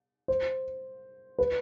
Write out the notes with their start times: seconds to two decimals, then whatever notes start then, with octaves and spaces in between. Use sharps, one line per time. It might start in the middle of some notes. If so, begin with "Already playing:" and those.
0.28 C5
1.39 B4